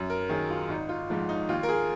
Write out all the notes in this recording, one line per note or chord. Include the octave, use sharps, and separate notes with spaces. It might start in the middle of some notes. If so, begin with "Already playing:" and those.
Already playing: F#2
A#4
D#3 F#3 G#4
F4
G#1 D#4
F4
G#2 F3
D#4
D#2 F4
A#4
G#4